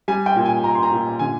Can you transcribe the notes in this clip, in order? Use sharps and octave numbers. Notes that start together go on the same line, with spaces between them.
G3 G#5
G5
A#2
G#5
A#2 A#5
C6
A#5
A#2
D3 G#5